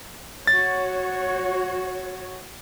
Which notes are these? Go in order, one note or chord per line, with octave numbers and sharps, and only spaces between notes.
F#4 C#5 A6